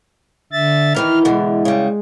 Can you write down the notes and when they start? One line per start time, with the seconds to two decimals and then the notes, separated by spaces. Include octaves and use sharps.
0.52 D3 E5 A6
0.95 D#3 E3 D#4 F6
1.25 B2 D3 E3 G#3
1.65 C#3 G3